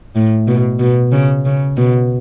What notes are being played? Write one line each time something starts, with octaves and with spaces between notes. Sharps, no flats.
A2
B2
B2
C#3
C#3
B2